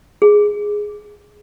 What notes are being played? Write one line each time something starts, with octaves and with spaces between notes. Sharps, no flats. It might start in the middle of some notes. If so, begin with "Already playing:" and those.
G#4